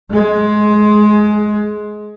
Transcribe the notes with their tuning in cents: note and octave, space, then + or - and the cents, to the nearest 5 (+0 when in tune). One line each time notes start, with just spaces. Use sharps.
G#3 +20